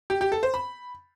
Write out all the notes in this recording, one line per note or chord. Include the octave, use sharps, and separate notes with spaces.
G4
G4
A4
C5
B5